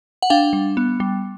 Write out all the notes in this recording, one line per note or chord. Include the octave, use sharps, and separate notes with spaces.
F#5
D4 F5 G5
G3
B3
G3